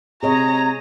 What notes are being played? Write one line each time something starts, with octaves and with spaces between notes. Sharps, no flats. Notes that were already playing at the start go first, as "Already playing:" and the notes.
C3 G#4 C#5 D#5 A#5